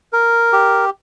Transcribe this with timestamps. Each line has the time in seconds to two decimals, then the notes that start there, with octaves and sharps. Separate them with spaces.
0.13 A#4
0.53 G4